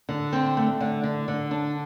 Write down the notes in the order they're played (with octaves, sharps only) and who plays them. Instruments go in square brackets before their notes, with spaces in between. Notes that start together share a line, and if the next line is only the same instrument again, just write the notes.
[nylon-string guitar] D3
C4
A3
D3
D3
D3
D4